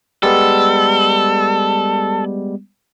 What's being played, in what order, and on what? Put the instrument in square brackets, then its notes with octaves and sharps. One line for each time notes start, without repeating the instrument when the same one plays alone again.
[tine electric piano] G3 G#3 B3 [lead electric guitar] A4